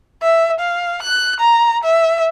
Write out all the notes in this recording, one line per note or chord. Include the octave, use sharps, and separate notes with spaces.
E5
F5
F#6
A#5
E5